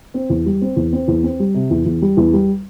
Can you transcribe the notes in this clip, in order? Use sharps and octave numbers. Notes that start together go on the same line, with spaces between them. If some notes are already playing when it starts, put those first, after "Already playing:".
C4
E2
G3
C4
E2
C4
E2
C4
G3
C3
E2
E2
G3
E2
G3